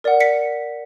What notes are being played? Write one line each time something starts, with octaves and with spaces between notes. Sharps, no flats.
A#4 D5 F#5
B6 C#7